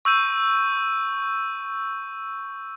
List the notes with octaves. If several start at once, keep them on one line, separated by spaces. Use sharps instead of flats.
C#6 E6 G6 D#7